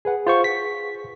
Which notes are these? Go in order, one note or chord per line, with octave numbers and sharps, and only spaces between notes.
G#4 B4 F#5
F4 C5 C#6
B6